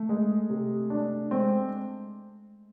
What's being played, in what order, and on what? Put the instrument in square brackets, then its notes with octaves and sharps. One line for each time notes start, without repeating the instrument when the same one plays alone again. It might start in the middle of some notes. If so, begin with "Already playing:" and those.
Already playing: [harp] A3
[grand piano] G#3
C3
D4
[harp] G#3 [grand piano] C4